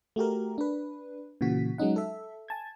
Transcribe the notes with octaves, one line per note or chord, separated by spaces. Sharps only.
A3 F#4 G4 A#4
D4 B4
A#2 C#3 E3 F#4 B6
F#3 G#3 C#4 D#4 F#5
A4 E5
G#5 A5 G#6